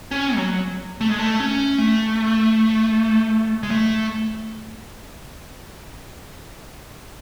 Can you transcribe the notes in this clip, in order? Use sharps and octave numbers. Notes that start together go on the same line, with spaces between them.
C#4
F#3
A3
G#3
A3
C#4
A3
G#3
A3